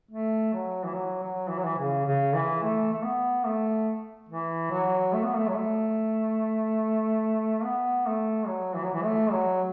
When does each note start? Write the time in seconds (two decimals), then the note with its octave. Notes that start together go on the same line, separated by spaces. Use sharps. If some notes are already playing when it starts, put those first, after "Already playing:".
0.11 A3
0.53 F#3
0.85 E3
0.94 F#3
1.23 F#3
1.50 E3
1.58 F#3
1.65 E3
1.78 C#3
2.06 C#3
2.35 E3
2.63 A3
2.93 A3
3.03 B3
3.45 A3
4.29 E3
4.71 F#3
5.13 A3
5.24 B3
5.36 A3
5.48 F#3
5.55 A3
7.64 B3
8.06 A3
8.47 F#3
8.76 E3
8.84 F#3
8.94 E3
9.04 A3
9.32 F#3